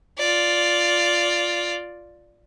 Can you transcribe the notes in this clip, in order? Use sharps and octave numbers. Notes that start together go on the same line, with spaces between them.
F4 D5